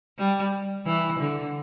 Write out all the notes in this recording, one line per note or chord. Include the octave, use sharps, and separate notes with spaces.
G3
E3
D3